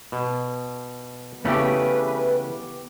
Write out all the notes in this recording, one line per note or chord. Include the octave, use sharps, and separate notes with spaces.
B2
C#3 E3 A3 B3 G4 B4